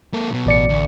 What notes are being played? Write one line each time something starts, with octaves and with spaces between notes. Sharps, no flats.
A#3 A4
B1 B2
A1 D5 C#7
D2